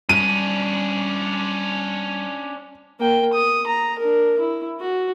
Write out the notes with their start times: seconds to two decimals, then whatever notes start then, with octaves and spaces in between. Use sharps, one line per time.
0.09 G3 C#4 D4 D#7
3.00 A#3 G5
3.33 D#6
3.67 A#5
3.99 D4 A#4
4.39 E4
4.80 F#4